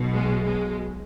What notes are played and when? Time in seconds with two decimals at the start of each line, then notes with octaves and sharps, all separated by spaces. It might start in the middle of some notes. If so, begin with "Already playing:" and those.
Already playing: B1 B2
0.13 G#3
0.45 G#3